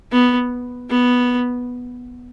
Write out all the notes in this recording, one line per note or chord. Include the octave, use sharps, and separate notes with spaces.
B3
B3